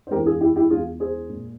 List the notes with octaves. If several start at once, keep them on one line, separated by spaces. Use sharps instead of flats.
C5
E2 E3 G#3 G4 A#4
F4 G#4
E4 G4
E4 G4
E2 E3 G#3 F4 G#4
G#4 C5
A#2 G#3